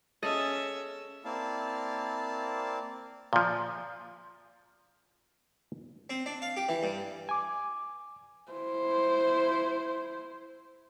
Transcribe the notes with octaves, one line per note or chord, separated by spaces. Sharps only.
C#4 G#4 A4 D#5 E5
A#3 C4 E4 D5 F5 A5
A#2 F3
C4
D4
F5
G4
E3
G2
G#5 D6
E4 C5